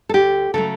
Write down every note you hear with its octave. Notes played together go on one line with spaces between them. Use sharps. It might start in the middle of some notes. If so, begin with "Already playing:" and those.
A4
D2 G4
C#3 F#3 A3 A4